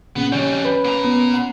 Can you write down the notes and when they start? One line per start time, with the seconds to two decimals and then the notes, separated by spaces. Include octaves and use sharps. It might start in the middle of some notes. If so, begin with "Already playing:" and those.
0.16 A#2 C#3 B3
0.32 F2 G3 C#4 G6
0.65 B4 B5
0.84 A#2 A#5
1.05 B3
1.34 F#5 B5 C7